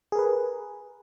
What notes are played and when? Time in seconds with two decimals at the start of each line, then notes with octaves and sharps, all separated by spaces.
0.12 G#4
0.15 A#4
0.19 B4